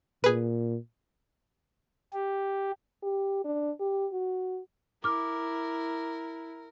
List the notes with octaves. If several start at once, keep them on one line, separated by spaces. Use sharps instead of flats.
A#2 G#4 B4
G4
G4
D4
G4
F#4
E4 A#4 D6 F6